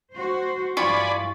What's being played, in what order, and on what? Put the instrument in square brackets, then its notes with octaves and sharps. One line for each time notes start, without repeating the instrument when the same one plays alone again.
[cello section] F#4 C5
[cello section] G2 E3 [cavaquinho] F4 [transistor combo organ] D5 G#5 B5 [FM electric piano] C#6